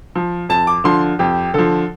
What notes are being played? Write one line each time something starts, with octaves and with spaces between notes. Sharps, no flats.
F3
F2 A5
D6
D3 F3 C6
F2 G4
D3 F3 A4